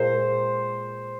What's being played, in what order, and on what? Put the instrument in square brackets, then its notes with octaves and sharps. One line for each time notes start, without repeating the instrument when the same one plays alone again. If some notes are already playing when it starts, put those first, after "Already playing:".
Already playing: [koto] A#2 G#3 A#4 [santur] C5